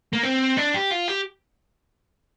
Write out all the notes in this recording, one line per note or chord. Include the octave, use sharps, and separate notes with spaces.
A#3
C4
D4
G4
F4
G4